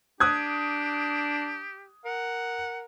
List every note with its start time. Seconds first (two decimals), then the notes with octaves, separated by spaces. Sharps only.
0.20 D4 G4 D#6 F#6 G#6
2.05 A#4 F#5